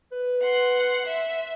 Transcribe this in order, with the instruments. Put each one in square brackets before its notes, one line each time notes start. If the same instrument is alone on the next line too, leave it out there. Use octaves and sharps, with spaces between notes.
[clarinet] B4
[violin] F#5 C6
E5